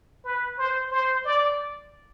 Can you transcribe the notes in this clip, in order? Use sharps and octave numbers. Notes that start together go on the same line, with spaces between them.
B4
C5
C5
D5